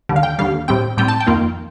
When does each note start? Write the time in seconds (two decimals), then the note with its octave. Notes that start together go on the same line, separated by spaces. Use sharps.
0.09 D#2 D3 G3
0.16 F5
0.23 G5
0.39 D#2 D3 G3 F5
0.68 A2 G3 C4 G5
0.97 A2 G3 C4 G5
1.08 A5
1.21 G5
1.26 F2 D#3 A#3 F4